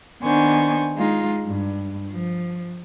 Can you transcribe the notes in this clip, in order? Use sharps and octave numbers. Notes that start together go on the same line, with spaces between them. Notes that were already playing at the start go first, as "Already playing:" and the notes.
D#3 B3 D4 C5 G#5 C#6
G#3 D#4 F4
G2
F3